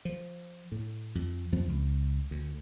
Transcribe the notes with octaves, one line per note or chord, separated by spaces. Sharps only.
F3
A2
F2
F2 F3 C4
C#2
D2